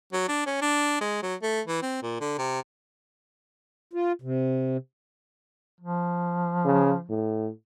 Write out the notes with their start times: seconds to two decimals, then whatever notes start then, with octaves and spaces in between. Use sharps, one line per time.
0.13 F#3
0.28 D4
0.46 C#4
0.62 D4
1.01 G#3
1.23 F#3
1.42 A3
1.67 E3
1.82 C4
2.03 A#2
2.21 D3
2.38 C3
3.93 F4
4.22 C3
5.80 F3
6.65 C#3
7.10 A2